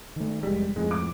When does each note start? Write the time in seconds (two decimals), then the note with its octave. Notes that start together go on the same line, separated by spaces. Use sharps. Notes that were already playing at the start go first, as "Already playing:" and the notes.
0.16 D#3 A3
0.43 F1 G3 G#3
0.76 F2 A2 G#3
0.91 D6